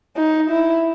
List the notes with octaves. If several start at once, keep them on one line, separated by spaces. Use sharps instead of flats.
D#4
E4